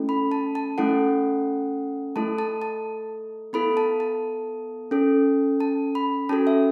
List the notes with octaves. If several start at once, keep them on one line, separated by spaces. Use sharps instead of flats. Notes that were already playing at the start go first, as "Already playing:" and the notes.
Already playing: A3 C#4 E4 A4
B5
A5
A5
A3 C#4 E4 A4 F#5
A3 E4 A4 A5
A5
A5
B3 E4 A4 B5
A5
A5
C#4 A4
A5
B5
C#4 F#4 A4 A5
E5